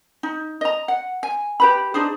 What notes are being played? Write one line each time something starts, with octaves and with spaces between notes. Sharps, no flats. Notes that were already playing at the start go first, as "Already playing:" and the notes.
D#4
D#5 A#5
F#5
G#5
G4 B4 B5
D4 D#4 G#4 C5